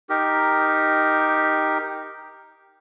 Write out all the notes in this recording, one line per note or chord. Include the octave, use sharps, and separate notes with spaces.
D#4 G4 A#4